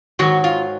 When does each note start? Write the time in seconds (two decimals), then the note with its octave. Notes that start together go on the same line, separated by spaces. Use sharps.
0.19 G#2 D#3 F#3 F#4
0.44 F4